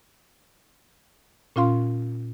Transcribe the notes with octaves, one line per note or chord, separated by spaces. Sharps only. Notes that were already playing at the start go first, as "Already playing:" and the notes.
A#2 C#4 F4 F5 C6